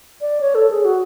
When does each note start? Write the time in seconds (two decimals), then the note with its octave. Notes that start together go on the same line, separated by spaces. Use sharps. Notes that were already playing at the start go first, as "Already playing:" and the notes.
0.21 D5
0.41 C#5
0.55 A4
0.70 G#4
0.85 F#4